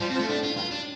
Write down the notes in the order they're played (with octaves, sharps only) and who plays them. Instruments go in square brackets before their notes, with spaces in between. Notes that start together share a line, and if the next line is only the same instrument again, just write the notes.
[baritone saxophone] F3 [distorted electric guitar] G3
[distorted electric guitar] C4
[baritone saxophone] F3
[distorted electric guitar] A3
[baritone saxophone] A2 [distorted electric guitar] D4
[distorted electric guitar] F4
[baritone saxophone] G2 [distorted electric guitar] F4
[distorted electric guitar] D4